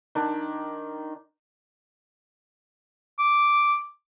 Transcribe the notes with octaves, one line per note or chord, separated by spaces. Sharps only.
D#3 D4
D6